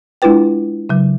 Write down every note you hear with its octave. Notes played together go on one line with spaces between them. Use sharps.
G#3 D4 E4 F4 B4 G5
C#3 F#3